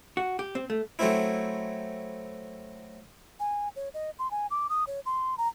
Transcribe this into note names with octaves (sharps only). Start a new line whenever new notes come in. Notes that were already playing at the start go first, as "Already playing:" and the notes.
F#4
G4
C4
A3
F#3 A3 C4 E4
G#5
C#5
D#5
C6
G#5
D6
D#6
C#5
C6
A#5